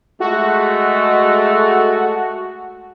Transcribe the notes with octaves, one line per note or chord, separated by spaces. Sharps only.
G#3 A3 F#4